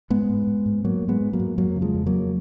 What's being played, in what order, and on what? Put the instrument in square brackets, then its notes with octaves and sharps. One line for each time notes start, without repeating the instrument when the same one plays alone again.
[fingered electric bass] G#2 G#3 B3
G#2
G#2
G#2
G#2 F#3 A#3
G#2
G#3 B3
G#2
F#3 A#3
G#2
F2 F#3 A#3
C#3
F3 G#3
F2
F#3 A#3
F2